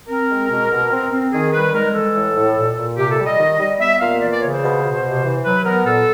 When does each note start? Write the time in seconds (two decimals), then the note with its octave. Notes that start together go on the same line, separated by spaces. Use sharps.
0.09 C4 A#4
0.30 G#3
0.50 B2
0.70 B2
0.92 C4
1.12 C4
1.33 D#3 G#4
1.53 G3 B4
1.73 G#3 A#4
1.94 E3 A4
2.15 A2
2.35 A2
2.56 A#2
2.77 A#2
2.98 C3 G4
3.11 A4
3.18 G3
3.25 D#5
3.39 D#3
3.59 G3
3.80 B3 E5
4.00 A#2 F5
4.21 E3 D5
4.32 D5
4.42 C#3 C#5
4.52 C5
4.63 B2
4.83 B2
5.04 C3
5.24 E3
5.44 F#3 B4
5.65 B3 A#4
5.85 A#2 A4